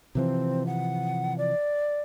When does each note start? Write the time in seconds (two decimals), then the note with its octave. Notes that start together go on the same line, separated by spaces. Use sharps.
0.15 C3 E3 F3 C4
0.67 F#5
1.38 D5